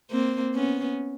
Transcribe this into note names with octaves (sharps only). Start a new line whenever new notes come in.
A#3 C4
B3 C#4